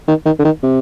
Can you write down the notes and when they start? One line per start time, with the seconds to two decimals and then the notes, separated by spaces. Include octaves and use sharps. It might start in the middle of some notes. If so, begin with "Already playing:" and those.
0.08 D#3
0.26 D#3
0.39 D3
0.45 D#3
0.63 C3